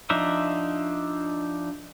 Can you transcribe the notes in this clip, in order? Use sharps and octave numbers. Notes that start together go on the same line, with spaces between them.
F3 D4 D#4 E5